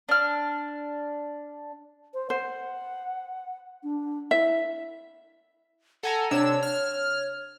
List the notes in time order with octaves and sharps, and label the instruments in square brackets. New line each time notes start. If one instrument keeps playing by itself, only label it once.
[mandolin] D4 F6
[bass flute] C5
[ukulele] C5 [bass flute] F#5
[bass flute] D4
[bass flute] E4 [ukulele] E5
[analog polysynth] A4 G#5 A#5 [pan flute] F#5
[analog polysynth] C3 D4 E6 [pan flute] C#5
[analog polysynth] F6